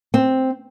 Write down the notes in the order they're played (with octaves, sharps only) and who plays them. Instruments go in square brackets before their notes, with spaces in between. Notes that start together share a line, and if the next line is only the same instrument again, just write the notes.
[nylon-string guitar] C4